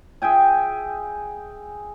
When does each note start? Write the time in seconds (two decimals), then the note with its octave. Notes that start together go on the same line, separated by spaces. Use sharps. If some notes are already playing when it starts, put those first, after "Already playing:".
0.22 G#4 E5 G5 G#5